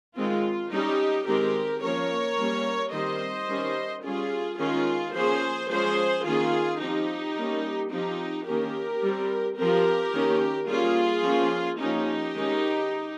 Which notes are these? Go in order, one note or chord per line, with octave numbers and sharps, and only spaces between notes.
D#3 G#3 C4 F4
G3 C#4 D#4 G4
D#3 G#3 C4 G4 A#4
F3 A#3 C#4 A#4 C#5
G3 A#3 C#4
D#3 G3 C4 C5 D#5
D#3 G3 C#4
G3 C#4 F4 G#4
D#3 G#3 C#4 F4 G#4
F3 A#3 C#4 G#4 C5
F3 G#3 C#4 G#4 C5
D#3 A#3 C#4 F4 G#4
F3 C4 D#4 G4
G3 A#3 C#4
F3 C4 D#4 G4
D#3 A#3 C#4 G4 A#4
G3 C4
F3 C4 G4 A#4
D#3 A#3 C#4
G3 A#3 C#4 F4 G#4
F3 A#3 C#4
F3 A#3 C#4 D#4 G4
D#3 G#3 C#4